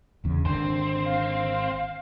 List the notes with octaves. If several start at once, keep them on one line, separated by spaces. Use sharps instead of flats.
G1 E2 C#3
G#1 D3 C4
F5